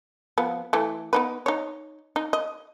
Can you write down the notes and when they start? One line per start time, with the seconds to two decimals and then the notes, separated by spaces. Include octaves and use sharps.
0.38 F3 B3
0.73 E3 A3
1.13 B3 D#4 B4
1.46 D#4 C#5
2.16 D#4
2.33 D#5